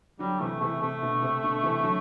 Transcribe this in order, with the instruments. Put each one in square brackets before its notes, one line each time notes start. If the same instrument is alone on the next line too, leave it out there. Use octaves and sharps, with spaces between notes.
[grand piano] D3 F#3 [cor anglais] G3
[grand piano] C3 E3 [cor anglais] A3
[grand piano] C3 E3 [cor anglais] A3
[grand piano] C3 [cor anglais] A3
[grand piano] B2 D3
C3
B2 D3
C3 E3
D3 F#3